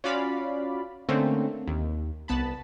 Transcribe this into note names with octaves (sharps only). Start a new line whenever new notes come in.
C#4 F4 F#4 D5 F5 B5
D3 A3 A#3 C4 C#4
D#2
C2 B3 A5 B5